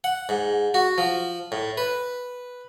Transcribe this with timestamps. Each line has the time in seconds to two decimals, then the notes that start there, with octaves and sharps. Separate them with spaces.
0.04 F#5
0.29 G#2
0.74 F#4
0.98 F3
1.52 A2
1.78 B4